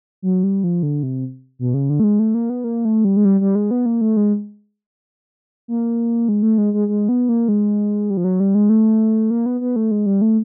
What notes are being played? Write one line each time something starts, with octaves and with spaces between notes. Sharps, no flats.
F#3
G3
F3
D3
C3
B2
C#3
D3
A3
G#3
A3
A#3
B3
A#3
A3
G3
G#3
G3
G3
G#3
B3
A#3
A3
G#3
A#3
G#3
A3
G#3
G#3
G#3
B3
A#3
G#3
G3
F3
F#3
G3
G#3
A3
A#3
B3
B3
A3
G#3
G3
A3